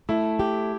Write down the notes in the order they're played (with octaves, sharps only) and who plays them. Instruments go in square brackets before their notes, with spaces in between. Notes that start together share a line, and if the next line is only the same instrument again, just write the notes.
[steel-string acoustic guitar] A3 [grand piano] E4
[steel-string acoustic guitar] G4